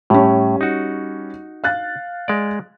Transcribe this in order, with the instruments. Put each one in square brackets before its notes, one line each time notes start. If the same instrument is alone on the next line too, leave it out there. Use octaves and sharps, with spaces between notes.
[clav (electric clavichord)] A2 [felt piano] G3 C#4
[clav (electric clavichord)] D#4 F#4
[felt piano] F5 F#6 A6
[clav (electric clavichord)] G#3 D5